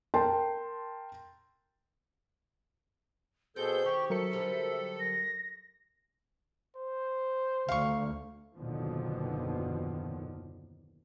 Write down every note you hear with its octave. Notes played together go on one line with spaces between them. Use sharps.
A#4 G5 A5 C6
B2 C4 G#4 A4 G6
D#3 G4 C#6
F#3 A4 A#4 E5 C#7
D3 G3 C4
A#6
C5
D2 F5 C#6
F#1 D#2 B2 D3 D#3 F3